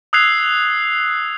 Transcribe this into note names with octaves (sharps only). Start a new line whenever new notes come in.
D#6 E6 F#6 G#6 C7 F7